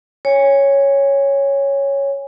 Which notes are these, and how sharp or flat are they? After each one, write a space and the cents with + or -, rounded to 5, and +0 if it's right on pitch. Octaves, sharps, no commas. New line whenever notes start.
C#5 +0 G#5 -25